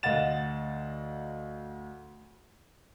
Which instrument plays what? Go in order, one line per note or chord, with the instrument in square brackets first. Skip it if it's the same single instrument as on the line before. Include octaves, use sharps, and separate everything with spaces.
[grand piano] D2 D#5 F5 F#5 A6 E7